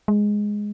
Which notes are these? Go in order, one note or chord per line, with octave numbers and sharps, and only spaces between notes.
G#3